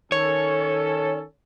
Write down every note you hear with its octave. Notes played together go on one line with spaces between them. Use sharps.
D#3 C#4 A4 C#5